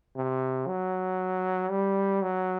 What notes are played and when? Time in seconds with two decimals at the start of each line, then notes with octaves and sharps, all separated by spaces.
0.16 C3
0.67 F#3
1.70 G3
2.22 F#3